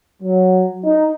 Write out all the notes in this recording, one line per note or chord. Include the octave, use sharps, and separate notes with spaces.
F#3
D#4